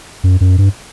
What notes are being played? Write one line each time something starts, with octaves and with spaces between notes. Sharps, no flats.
F#2
F#2
G2